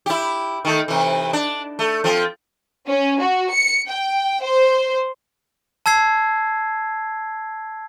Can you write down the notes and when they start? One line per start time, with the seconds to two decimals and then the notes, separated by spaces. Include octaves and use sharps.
0.06 E4 G4
0.65 D#3 A3
0.88 C3 E3
1.33 D4
1.79 A3
2.04 F3 C4
2.87 C#4
3.20 F#4
3.50 C#7
3.88 G5
4.41 C5
5.86 A5 E6 G#6 C7